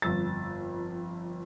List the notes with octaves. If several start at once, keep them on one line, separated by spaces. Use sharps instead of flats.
G1 F2 E6 A6